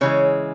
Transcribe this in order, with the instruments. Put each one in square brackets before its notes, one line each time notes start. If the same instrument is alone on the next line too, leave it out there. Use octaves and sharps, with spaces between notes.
[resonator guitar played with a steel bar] C#3 E3 G#3 C#5